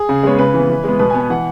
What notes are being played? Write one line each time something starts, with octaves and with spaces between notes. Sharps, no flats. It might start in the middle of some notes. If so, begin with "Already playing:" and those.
Already playing: G#4
C#3
G#3 B3 C#5
C#3 B4
E3 B3
E3
G#3 B3
B2 B4
G#5
B3
G#5
E3 F#5